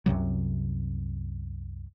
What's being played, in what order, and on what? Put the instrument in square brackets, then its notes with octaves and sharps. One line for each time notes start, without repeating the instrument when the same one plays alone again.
[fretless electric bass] C2 F#2 C3 F#3